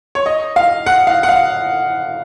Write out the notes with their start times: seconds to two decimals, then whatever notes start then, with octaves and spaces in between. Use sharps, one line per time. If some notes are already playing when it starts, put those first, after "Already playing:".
0.15 C#5
0.26 D#5
0.56 F5
0.86 F#5
1.07 F5
1.23 F#5
1.29 F5